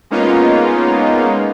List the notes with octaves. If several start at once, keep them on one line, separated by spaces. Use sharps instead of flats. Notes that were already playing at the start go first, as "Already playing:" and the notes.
G#3 A#3 B3 C#4 D#4 F4